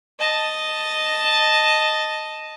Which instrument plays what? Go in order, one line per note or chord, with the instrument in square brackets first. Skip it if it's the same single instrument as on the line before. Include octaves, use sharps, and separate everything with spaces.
[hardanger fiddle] D#5 A5